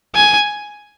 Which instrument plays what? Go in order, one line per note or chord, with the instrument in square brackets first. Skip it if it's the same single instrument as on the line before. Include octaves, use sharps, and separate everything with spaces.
[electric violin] G#5